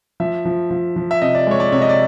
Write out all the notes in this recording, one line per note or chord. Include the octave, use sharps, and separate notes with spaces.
F3 E5
F3
F3
F3
E5
C3 D#5
D5
G#3 C#5
D5
C3 C#5
D#5
D5